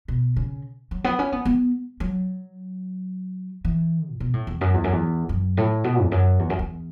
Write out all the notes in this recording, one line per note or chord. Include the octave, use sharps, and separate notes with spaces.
B2
C#3
F#3
B3
C#4
B3
B3
F#3
E3
A2
B2
A2
E2
F#2
E2
F#2
E2
F#2
A2
B2
E2
F#2
E2
F#2
E2